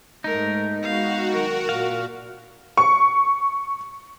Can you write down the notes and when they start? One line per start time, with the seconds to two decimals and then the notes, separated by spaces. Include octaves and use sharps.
0.24 G#2 A3 D#4 A#4
0.82 G#3 B3 F#4 F5
1.32 D#3 F#3 A#4
1.69 A#2 F5
2.77 C#6